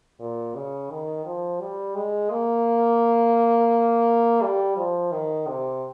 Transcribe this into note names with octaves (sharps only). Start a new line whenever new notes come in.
A#2
C#3
D#3
F3
G3
G#3
A#3
G3
F3
D#3
C3